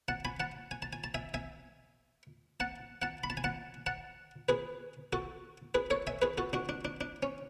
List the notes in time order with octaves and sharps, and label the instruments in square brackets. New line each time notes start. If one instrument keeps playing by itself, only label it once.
[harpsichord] F#5 A5
G#5 B5
F#5 A5
G#5
A5
G#5
A5
E5 G#5
E5 G#5
F#5 A5
F#5 A5
B5
A5
G#5
F#5 A5
F#5 A5
G#4 B4
F#4 A4
G#4 B4
A4 C#5
E5 G#5
G#4 B4
F#4 A4
D4 F#4
D4
D4
D4
C#4